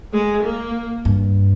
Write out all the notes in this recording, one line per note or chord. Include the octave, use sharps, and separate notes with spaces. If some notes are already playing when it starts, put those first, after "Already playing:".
G#3
A#3
G2